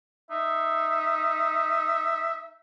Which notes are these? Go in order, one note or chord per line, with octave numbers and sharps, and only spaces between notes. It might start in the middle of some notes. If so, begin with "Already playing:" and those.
D#4 E5